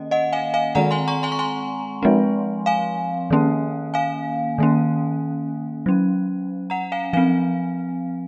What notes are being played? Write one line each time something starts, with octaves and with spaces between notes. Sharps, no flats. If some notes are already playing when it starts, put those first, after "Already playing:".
Already playing: D#3 A#3 C#4 D#5
D#5 F#5
F5 G#5
F5 G#5
D#3 G#3 C4 F#5 A#5
G#5 C6
A#5 C#6
G#5 C6
C#6
G#5 C6
F3 G#3 C4
F5 G#5
D#3 A#3 C#4
F5 G#5
D#3 A#3 C#4
F#3 C#4
F#5 A#5
F5 G#5
F3 C4 F5 G#5